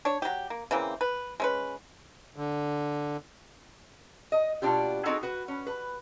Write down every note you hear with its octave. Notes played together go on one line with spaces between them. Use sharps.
D4 C#5
F#3 G4
A#3
C#3 E3 A#3 C4
B4
G#3 C#4 B4
D3
D#5
B2 A#3 C4 D4 F4 G4
C4 D#4 E4 F#4 G#4 A4
F#4 B4
C#4
B4